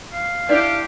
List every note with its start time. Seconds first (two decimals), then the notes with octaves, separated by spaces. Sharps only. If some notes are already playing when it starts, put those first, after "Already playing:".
0.13 F5
0.49 D4 E4 F4 G4